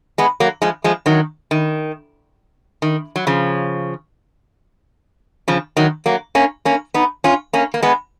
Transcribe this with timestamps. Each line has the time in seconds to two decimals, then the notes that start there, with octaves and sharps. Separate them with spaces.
0.18 G#3 B3
0.40 F#3 A#3
0.62 F3 G#3
0.84 F3 G#3
1.06 D#3 F#3
1.51 D#3
2.82 D#3
3.16 F#3
3.27 C#3 F3
5.48 C#3 F3
5.77 D#3 F#3
6.06 F#3 A#3
6.35 A#3 C#4
6.65 A#3 C#4
6.94 B3 D#4
7.24 C#4 F4
7.53 A#3 C#4
7.74 A#3
7.82 G#3 B3